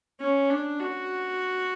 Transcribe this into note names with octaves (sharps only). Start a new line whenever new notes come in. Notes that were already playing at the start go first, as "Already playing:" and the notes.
C#4
D4
F#4